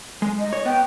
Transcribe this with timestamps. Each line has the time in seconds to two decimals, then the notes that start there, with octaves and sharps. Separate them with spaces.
0.22 G#3
0.39 D#5
0.53 C#5
0.65 B3 G5